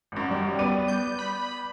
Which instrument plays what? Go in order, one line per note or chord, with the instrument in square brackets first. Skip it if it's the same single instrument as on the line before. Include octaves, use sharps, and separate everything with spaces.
[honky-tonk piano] G#1 F#2
[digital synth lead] G3
[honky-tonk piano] B3 D5 D#7
[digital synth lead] G6
B5